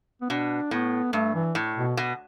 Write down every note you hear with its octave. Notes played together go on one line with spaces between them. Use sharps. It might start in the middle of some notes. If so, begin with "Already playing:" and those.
B3
B2 D4
A2 B3
G2 A3
E3
A2
B2
B2